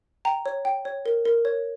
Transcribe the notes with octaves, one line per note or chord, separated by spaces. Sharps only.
G5 A#5
C#5
G5
C#5
A#4
A#4
C#5